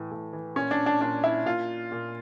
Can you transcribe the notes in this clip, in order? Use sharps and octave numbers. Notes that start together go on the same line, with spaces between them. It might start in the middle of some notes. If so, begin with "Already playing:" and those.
Already playing: A2 E3
A2
E3
A#2 C#4
D4
D4
A#2 D4
E4
A#2 F4
A#2